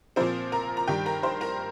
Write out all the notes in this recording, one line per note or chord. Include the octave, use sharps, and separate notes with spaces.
A#2 F3 C4 C5
A#4 A#5
A#5
G2 D#3 G3 G4 G5
A#4 A#5
C5 C6
A#4 A#5